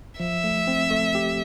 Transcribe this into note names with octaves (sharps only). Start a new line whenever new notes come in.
F3 E5
A3
C4
A3
G4